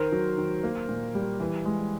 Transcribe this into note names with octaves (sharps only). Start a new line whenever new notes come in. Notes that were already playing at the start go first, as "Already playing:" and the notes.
Already playing: D#3 A#4 C5
F#3
D#3
A#3
A#2
G3
E3
G#3